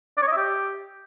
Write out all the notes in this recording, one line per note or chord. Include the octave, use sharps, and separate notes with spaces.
D5
C#5
D#5
E5
G4